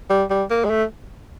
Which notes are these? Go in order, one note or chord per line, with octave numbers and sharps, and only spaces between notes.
G3
G3
A#3
G#3
A3